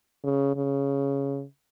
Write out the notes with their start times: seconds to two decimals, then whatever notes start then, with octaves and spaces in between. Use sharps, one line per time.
0.24 C#3
0.56 C#3